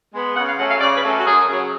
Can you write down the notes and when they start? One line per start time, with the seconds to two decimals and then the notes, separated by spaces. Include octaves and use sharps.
0.13 G#3 B3
0.35 C#3 F#5
0.47 F5
0.58 F#3 A3 C#4 F#5
0.69 F5
0.80 C#3 D5
0.96 B4
1.03 F#3 A3 C#4
1.19 F#4
1.25 F#2 G#4
1.48 C#3 F#3